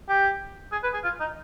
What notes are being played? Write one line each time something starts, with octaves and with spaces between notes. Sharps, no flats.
G4
G#4
B4
G#4
F4
D#4